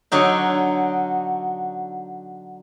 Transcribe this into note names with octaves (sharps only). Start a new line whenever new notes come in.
D3 F#3 D#4